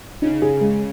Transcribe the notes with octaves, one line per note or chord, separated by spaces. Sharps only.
C#3 D#4
G#4
G#3